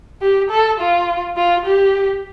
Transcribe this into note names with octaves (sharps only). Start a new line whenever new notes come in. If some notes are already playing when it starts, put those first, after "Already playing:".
G4
A4
F4
F4
G4